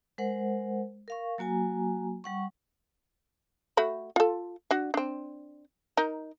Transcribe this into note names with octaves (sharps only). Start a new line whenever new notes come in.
G#3 A#4 C5 F#5
A#4 F5 C#6
F#3 A#3 F#4 G#5 A#5
G3 F#5 C#6
A3 F#4 B5
F4 A4
D4 F#4
C4 D4
D#4 A#4